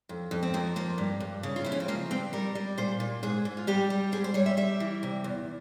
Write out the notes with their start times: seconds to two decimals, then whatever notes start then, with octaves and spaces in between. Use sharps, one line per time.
0.09 F2
0.31 F2
0.43 C4
0.54 F3 A#3
0.76 F3 A#3
0.98 G2
1.20 G2
1.43 C#3
1.56 F4
1.64 F2 E4
1.72 C#4
1.80 C4
1.88 F3 A#3
2.11 G2 C4
2.33 G3 A#4
2.55 G3
2.78 A#2 C5
3.00 A#2
3.23 G#2 G#4
3.45 G#2
3.57 F4
3.67 G3 G4
3.90 G3
4.12 G#2 G#4
4.24 C5
4.34 G3 C#5
4.46 E5
4.57 G3 E5
4.80 E3
5.03 C3
5.24 E2